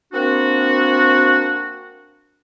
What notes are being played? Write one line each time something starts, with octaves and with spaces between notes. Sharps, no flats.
A#3 C4 D4 F#4